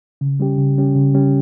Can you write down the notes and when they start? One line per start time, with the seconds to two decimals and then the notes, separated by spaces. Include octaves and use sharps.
0.21 C#3
0.40 G3 C#4 G4
0.58 C#3
0.77 G3 C#4 G4
0.96 C#3
1.14 G3 C#4 G4